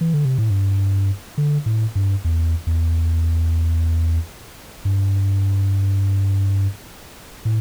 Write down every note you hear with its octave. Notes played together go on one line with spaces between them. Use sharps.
E3
D3
C3
A2
G2
D3
A2
G2
E2
E2
G2
A2